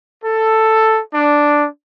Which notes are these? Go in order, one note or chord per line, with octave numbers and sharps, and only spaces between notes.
A4
D4